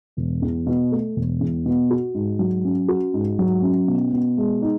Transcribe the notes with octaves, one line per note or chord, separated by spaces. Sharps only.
E1
E2
B2
A3
E1
E2
B2
F#4
G#2
F#3
C#4
F#4
G#2
F#3
C#4
B2
B2
G#3
D#4